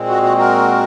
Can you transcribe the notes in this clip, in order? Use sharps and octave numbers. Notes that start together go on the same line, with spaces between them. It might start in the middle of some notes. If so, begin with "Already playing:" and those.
Already playing: A#2 G#3 C4
F#4
F#4
F#4 A#4